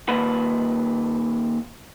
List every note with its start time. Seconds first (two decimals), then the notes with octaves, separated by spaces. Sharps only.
0.09 D#2 A#2 B4